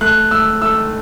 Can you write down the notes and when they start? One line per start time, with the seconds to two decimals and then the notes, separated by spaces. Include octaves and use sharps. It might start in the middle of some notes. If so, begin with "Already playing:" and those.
0.01 A3 F#6
0.31 A3 E6
0.62 A3 E6